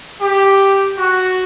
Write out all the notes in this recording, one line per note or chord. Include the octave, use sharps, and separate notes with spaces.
G4
F#4